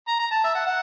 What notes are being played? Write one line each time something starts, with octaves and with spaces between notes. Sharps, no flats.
A#5
A#5
A5
E5
F#5
F#5